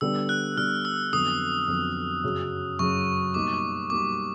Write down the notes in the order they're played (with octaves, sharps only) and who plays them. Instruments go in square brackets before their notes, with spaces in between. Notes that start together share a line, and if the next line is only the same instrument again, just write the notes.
[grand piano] D3 G3 B3 D4 [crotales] E6
[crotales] F#6
[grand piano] D3 G3 B3 D4 [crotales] F6
[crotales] E6
[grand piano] F2 D3 F#3 B3 [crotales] D#6
[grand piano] F2 D3 F#3 B3
F#2 C#3 F#3
[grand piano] F#2 C#3 F#3 [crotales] C#6
[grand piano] B2 G3 A#3 D#4 [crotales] D6
[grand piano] B2 G3 A#3 D#4 [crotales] D6